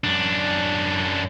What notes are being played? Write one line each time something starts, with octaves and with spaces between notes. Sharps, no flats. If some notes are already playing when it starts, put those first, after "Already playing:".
F#2 D4